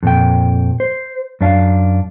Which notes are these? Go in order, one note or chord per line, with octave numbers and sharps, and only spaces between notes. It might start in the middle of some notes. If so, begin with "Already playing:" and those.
F2 A#2 G5
C5
F#2 D4 F5